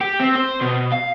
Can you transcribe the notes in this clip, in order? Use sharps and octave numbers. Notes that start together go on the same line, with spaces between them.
G4
C4
C5
B2
F5